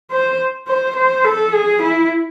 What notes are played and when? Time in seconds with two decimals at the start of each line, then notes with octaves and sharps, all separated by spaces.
0.11 C5
0.67 C5
0.96 C5
1.25 A4
1.53 G#4
1.82 E4